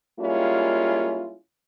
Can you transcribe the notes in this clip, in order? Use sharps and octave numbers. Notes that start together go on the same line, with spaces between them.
G3 G#3 A#3 C#4 E4 F4